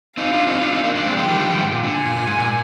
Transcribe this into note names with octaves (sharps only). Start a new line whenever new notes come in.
C4 D#4 F5
D4 F4
C4 D#4
D4 F4
C4 D#4
A#3 D4
A#3 D4
G#3 C4 G5
F3 G#3
D#3 G3
D3 F3
D#3 G3
G#2
A#2
D3
G#5
A#2
A#2
G#2
A#2